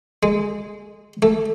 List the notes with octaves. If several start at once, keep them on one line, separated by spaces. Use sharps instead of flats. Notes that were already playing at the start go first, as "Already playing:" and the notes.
G#3
A3